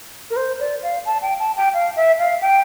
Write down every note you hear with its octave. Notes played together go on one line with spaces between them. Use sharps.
A#4
C5
D5
F5
A5
G5
A5
G5
F5
E5
F5
G5